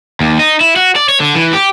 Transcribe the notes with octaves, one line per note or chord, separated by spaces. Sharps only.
D#2
D#4
E4
F#4
D5
C#5
D3
E3
G4